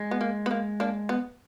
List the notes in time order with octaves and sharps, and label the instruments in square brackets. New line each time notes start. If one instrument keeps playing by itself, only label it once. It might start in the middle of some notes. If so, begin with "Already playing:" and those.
Already playing: [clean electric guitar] G#3
[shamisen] B3
A#3
B3
A#3
A#3 D4
B3